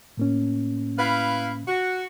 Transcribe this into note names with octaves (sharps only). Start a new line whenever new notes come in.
A2 A#3 C#4
E4 B4 F5
F#4